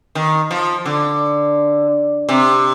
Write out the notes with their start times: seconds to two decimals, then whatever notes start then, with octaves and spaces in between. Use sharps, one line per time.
0.15 D#3
0.51 F3
0.86 D3
2.29 C3